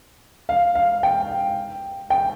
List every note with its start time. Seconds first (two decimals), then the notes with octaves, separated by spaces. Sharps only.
0.49 F5
0.75 F5
1.03 G5
2.10 G5